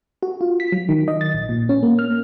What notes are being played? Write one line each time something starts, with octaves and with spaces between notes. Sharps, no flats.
F#4
F4
B6
F#3
D#3
D#5
A6
A#1
A#2
C#4
A#3
F6